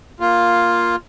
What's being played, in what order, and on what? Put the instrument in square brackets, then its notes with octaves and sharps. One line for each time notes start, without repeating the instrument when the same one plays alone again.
[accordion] A#3 F4